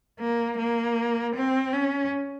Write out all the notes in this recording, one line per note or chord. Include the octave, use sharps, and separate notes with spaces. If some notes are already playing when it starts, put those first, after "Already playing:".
A#3
A#3
C4
C#4